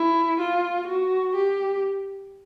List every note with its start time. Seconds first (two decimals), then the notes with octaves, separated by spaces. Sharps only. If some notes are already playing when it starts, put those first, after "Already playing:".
Already playing: E4
0.40 F4
0.87 F#4
1.35 G4